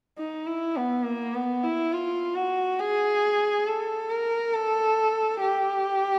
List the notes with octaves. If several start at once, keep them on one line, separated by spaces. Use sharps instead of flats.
D#4
E4
B3
A#3
B3
E4
F4
F#4
G#4
A4
A#4
A4
G4